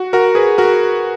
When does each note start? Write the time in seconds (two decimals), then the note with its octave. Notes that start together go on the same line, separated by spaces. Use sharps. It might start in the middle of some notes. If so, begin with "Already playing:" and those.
Already playing: F#4
0.13 F#4 A#4
0.35 G#4 B4
0.58 F#4 A#4